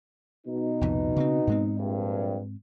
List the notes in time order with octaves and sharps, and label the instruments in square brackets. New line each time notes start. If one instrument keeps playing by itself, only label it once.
[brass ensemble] B2 D#4
[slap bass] C2 F2 A#2
C#3 C4
G#2 G#3 C4
[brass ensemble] A#1 G2